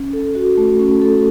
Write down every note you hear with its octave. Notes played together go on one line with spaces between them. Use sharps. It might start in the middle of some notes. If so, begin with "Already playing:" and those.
Already playing: C#4
A4
F#4
A3
C#4
A4